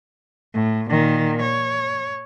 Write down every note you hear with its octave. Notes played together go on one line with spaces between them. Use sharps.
A2
A#2 D#3
C#5